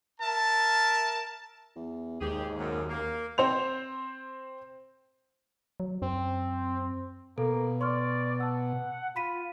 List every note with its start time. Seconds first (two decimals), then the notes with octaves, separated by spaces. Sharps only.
0.20 A#4 E5 A5
1.76 E2
2.21 D#2 G#2 G4 G#4
2.59 F#2
2.89 A#3
3.38 C4 C5 C6 F7
5.80 F#3
6.02 F#2 C4
7.38 B2 A#3 A4
7.81 D5 C6 C#6 F6
8.40 F#5 A5 E6
9.16 F4 B5 B6 D#7